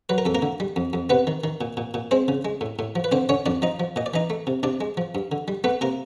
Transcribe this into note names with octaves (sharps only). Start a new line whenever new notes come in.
F#3 B4
A#4
F2 A4
A#3 A#4
D3
G3
F2
F2
C3 B3 B4
D#3
D#3
A#2
A#2
A#2
G#3 C4 C5
C#3
G#3
A2
A2
F3
B4
D3 C4 C5
D3 C#4 C#5
F2 D4 D5
F3 D#4 D#5
F3
A#2 D#5
D5
E3 D#4 D#5
A3
C3
C3 D4 D5
G#3
F3
G2
D3
G3
A3 B3 B4
C3 A#3 A#4